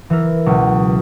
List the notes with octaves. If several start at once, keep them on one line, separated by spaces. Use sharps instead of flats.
E3 E4 A#4
C#2 B2 F#3